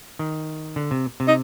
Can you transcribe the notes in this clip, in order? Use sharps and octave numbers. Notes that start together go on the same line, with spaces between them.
D#3
D3
C3
C3
D#4